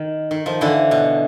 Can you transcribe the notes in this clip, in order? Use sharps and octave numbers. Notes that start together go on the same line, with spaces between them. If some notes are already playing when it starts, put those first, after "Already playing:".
Already playing: D#3
D#3
D#3 F3
D3 E3
B2